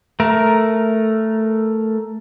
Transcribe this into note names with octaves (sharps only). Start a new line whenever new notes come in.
A3 A#4